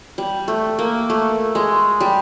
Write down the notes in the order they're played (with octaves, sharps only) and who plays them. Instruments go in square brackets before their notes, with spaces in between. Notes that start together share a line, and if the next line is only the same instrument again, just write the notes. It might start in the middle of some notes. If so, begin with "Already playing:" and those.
[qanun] G3
A3
A#3
A3
G#3
G3